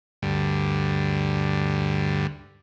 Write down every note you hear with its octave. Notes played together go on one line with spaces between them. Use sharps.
D2 G2